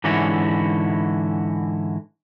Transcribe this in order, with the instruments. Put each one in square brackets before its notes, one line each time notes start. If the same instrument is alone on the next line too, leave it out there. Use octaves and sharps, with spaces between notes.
[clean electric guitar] G#2 D3 E3 C#4 E4 F#4